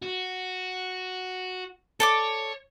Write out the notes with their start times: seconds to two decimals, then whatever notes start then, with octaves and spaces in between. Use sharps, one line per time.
0.03 F#4
2.00 A4 C#5 D5 D6